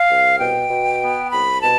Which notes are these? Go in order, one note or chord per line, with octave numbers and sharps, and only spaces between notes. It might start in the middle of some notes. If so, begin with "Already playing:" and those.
Already playing: F5
C2
B2 G5
B2
B3
C2 B5
B2 A5